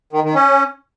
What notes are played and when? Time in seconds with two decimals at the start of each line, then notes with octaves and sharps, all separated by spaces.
0.13 D#3
0.24 D#3
0.35 C#4